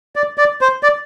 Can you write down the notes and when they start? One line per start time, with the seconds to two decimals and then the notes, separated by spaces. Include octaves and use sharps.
0.16 D5
0.38 D5
0.61 C5
0.83 D5